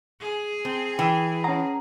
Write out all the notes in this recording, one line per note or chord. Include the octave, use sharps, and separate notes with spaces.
G#4
C4 A5
E3 G5 A5 E6
C#4 F#5 A5 A#5 D#6